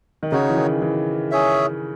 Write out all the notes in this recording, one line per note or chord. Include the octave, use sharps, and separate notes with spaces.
D#3
C#3 D#4 F#4 C#5
E3
D#3
E3
C#4 G#4 C#5 E5